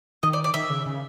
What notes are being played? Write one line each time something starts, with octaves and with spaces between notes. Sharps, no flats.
D#3 D#5
D5
D5
D#3 E5
C#3
C#3